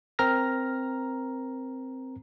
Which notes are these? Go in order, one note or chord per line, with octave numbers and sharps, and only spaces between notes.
C4 A#4 A#5 F6 A#6